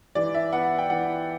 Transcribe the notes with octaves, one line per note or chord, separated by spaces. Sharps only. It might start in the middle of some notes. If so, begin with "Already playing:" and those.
E3 D5
E5
B3 F#5
G5
E3 F#5